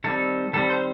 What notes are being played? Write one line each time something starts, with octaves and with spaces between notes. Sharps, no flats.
D#3 G3 C4 A4
D#3 G3 C4 A4
C5